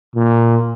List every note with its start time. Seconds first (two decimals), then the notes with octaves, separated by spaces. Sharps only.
0.16 A#2